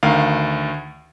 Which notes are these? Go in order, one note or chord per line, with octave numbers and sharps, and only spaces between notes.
D2 D#3 F5